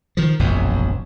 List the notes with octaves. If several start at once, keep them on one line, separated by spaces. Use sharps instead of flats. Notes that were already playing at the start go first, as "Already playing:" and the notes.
D#3 F3
E1 A#1 F#2